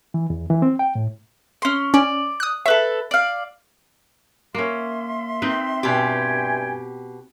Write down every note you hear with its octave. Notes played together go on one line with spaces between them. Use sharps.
E3
E2
E3
C4
G5
A2
C#4 C6
C#4 D5
D#6 F#6
A4 B4 C#5 E5
D5 F5
A#3 C#4 E5 C6
C4 D#4 B4
G2 B2 G4 G5 G#5